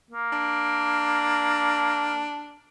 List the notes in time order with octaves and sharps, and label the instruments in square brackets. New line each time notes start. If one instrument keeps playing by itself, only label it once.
[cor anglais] A#3
[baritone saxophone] D4